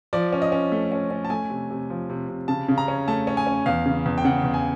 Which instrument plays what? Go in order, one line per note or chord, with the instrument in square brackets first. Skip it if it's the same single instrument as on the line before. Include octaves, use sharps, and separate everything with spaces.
[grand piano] F3 D5
C#4
D#5
C#4
A3
C#4
C#4
A5
A3 G#5
C3
C3
F3
C3
C3
C#3 A5
C#3
A#5
C#4
A3 A5
C#4
G#5
C#4
E2 F5
C#3
E2
G5
C#3 F#5
E2
G#5